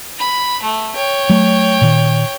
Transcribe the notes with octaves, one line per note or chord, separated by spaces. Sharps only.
B5
A3
C#5 G5
F#3 A3
A#2 D#3